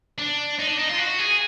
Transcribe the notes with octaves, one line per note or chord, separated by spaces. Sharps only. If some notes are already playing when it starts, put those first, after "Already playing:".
D4
D#4
D4
D#4
F4
F#4
G#4